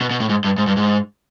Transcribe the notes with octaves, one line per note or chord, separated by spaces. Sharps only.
B2
B2
A2
G#2
G2
G#2
G2
G#2